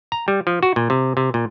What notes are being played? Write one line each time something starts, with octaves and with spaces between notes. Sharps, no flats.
A#5
G3
F3
F#4
A#2
C3
C3
A#2